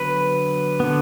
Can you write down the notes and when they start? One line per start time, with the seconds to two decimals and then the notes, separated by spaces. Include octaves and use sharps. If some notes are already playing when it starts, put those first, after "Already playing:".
Already playing: D3 F#3 B3 B4
0.80 D3 B3